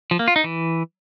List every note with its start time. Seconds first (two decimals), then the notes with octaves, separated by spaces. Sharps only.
0.11 F3
0.19 A#3
0.28 F4
0.36 D#4
0.44 E3